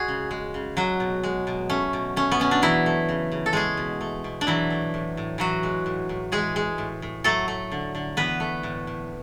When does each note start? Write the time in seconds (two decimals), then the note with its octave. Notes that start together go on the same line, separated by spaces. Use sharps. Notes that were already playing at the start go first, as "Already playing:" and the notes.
Already playing: G#3 F#4 G#4
0.08 C#3
0.31 G#3
0.54 C#3
0.77 F#3 G#3 F#4
1.00 B2
1.23 G#3
1.47 B2
1.69 A3 C#4
1.93 B2
2.16 A3 C#4
2.31 B3
2.40 B2 C#4
2.51 D4
2.62 E3 F#3 E4
2.86 A3
3.09 C#3
3.32 C#3
3.46 A4
3.53 G#3 A3 G#4
3.77 B2
4.01 A3
4.24 B2
4.41 D4
4.47 E3 F#3 E4
4.70 A3
4.94 A2
5.17 A2
5.38 E3 F#3 F#4
5.63 G#3
5.86 A2
6.09 A2
6.32 E3 G#3 G#4
6.56 G#3
6.78 A2
7.02 A2
7.24 F#3 A3 A4
7.48 A3
7.72 D3
7.95 D3
8.17 E3 B3 B4
8.40 A3
8.63 A2
8.87 A2